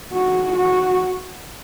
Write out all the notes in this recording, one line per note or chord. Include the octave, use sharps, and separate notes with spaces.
F#4
F#4